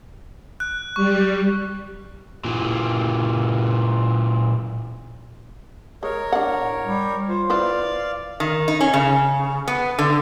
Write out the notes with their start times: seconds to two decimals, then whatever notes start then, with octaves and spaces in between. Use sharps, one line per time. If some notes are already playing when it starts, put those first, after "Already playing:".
0.60 F#6
0.96 G3 C#6
2.45 A#2 E3
6.03 G#3 A#4 C#5
6.32 D4 F#5
6.61 A2
6.85 G3
7.29 F4 C5
7.50 E4 B4 C5 D5 F5
8.40 D#3
8.68 D#4
8.81 C#4
8.94 C#3
9.68 B3
9.99 D3